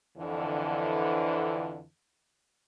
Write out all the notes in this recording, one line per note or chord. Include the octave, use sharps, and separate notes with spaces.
F2 D3 E3